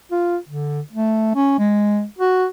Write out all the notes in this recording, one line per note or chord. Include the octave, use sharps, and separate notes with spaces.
F4
D3
A3
C#4
G#3
F#4